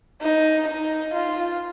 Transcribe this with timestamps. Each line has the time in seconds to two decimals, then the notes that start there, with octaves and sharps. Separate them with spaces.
0.21 D#4
0.68 D#4
1.14 F4